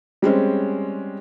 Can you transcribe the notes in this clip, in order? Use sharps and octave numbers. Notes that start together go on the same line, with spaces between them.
G3 G#3 C4 C#4